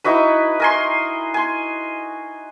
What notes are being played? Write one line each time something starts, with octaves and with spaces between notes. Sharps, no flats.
D#4 E4 F#4 B4
A#4 G#5 C6
G#5 C6